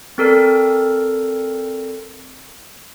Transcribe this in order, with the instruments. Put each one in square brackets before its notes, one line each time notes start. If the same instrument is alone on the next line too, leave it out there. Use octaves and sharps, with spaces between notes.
[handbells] C4 A4 A#4 D5